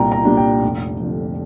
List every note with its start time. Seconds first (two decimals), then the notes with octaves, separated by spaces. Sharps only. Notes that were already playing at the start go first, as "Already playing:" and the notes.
Already playing: C2 A#2 G3 D4 G5 A#5
0.12 A#5
0.25 A#2 G3 D4
0.37 G5
0.62 F1
1.00 F2 D3